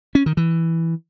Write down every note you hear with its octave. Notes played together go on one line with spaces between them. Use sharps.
C#4
D#3
E3